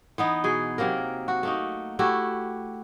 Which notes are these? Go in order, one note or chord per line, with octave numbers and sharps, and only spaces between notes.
E3 B3 D#4
B2 G#4
C3 F#3 A#3 A#4
F#4
A3 A#3 D#4
A3 E4 F#4 G4